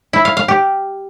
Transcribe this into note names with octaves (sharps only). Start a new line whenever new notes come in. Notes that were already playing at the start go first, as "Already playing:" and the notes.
E4
F5
F5
G4